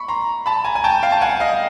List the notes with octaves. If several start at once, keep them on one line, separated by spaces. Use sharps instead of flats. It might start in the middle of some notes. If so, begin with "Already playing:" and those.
Already playing: B5 C#6
A#5 C6
A5 B5
G#5 A#5
G#5
G5 A5
F5 G5
A5
F#5 G#5
D#5 F5